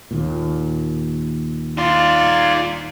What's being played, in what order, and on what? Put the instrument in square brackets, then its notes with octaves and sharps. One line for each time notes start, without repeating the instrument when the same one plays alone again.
[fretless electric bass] D#2 A#2
[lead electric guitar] D#4 C6 [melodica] F4 D5